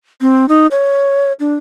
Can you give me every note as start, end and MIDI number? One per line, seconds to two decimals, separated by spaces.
0.21 0.45 60
0.49 0.67 63
0.71 1.33 73
1.40 1.55 62